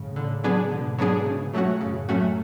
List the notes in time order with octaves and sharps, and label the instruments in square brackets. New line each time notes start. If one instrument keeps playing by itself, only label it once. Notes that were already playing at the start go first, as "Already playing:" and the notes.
Already playing: [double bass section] A2 C#3
[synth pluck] D3
F#3 B3 D4 G#4
[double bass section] G#2 B2 [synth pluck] D3
[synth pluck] F#3 B3 D4 G#4
C#3
F#3 A3 C#4 F#4
[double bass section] F#2 A2 [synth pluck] C#3
[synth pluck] F#3 A3 C#4 F#4